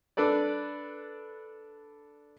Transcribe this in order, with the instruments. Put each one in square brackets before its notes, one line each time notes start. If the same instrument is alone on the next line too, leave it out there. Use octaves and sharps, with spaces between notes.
[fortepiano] D4 A4 B4 D5